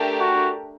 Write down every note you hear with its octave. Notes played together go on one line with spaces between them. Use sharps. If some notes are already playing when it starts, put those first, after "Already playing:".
Already playing: A3 D4 G4 A#4
F#4